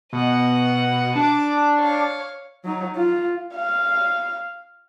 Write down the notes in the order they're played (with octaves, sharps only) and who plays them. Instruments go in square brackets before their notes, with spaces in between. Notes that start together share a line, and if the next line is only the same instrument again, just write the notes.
[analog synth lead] B2 [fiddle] D#5 F#5
[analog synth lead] D4 [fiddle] A5 D6
[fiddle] C#5 F5
[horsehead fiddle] F#3 D#4
F4
[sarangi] F5